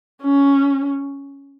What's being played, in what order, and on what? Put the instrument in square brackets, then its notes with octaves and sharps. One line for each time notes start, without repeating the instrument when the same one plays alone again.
[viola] C#4